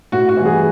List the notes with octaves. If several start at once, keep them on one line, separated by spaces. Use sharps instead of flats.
A2 F#4
F#4
E3 G3
G#4